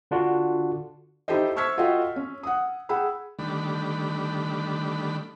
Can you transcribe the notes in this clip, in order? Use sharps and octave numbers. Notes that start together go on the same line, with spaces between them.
D3 D4 F4 F#4
D#4 E4 G4 A4 C5 D#5
C5 C#6 E6 F6 G#6 B6
F4 F#4 A4 D#5 F5 G5
C#4
F#5 D#6
G#4 F#5 G5 B5 E6
D3 D#3 G3 A3 D4 B5